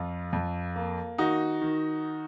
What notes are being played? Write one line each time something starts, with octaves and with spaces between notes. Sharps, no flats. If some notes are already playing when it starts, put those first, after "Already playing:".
Already playing: F2 F4
F2
A#3
D#3 D#4 F#4
D#3